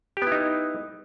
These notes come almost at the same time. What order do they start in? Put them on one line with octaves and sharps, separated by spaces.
G4 B3 E4 D#4